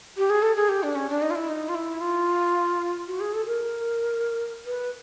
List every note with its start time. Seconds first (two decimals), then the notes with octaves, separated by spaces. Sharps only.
0.17 G4
0.30 G#4
0.42 A4
0.56 G#4
0.69 G4
0.83 D4
0.95 C#4
1.09 D4
1.22 D#4
1.30 F4
1.35 E4
1.48 D#4
1.69 F4
1.75 E4
2.01 F4
3.08 F#4
3.20 G#4
3.34 A4
3.46 A#4
4.66 B4